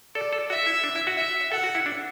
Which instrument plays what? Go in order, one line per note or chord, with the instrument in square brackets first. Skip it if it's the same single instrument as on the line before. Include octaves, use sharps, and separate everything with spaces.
[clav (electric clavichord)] A4 [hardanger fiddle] D5
[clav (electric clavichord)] A4
[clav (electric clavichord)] F#4 [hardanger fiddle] E5
[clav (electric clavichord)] E4
D4
E4
F#4
[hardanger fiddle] E5
[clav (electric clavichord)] A4 [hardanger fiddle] F#5
[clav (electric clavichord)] F#4
E4
D4